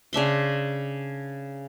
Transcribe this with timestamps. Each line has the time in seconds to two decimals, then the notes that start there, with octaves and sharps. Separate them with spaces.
0.13 C#3 D4 E5 C6